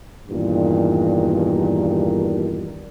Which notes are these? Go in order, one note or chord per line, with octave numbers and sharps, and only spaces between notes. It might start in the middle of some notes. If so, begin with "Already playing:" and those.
E2 G2 A#2 D#3